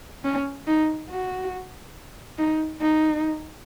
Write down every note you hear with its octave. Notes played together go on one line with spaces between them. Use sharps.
C#4
D#4
F#4
D#4
D#4